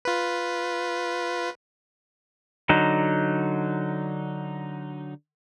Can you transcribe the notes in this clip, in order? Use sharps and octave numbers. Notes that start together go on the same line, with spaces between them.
F4 B4
D3 F#3 D#4